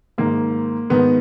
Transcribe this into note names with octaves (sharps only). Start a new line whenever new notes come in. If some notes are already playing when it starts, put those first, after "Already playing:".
G#2 D#3 A#3
G#2 D#3 B3